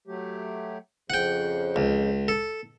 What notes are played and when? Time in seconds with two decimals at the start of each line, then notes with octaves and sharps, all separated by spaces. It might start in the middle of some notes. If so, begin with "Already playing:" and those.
0.07 F#3 A3 G4
1.10 F2 C#3 F3 F#5 G5
1.76 C#2
2.28 A4